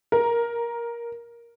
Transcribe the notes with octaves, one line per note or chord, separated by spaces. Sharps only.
A#4